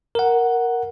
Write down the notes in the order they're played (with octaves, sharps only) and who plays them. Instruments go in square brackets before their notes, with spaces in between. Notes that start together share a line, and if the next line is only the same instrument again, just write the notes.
[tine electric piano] A#4 F#5